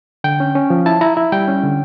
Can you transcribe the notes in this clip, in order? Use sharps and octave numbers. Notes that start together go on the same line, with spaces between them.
D3 G5
C#4
C#4
F3
E4 A5
E4 A#5
E4
G3 G5
C#4
D3